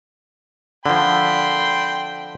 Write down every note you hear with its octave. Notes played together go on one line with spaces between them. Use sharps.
D3 F3 G5 B5 C6